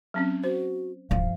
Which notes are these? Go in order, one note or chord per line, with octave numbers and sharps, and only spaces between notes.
F#3 C4 C#4
F#4 C5
D1 G2 F3 F5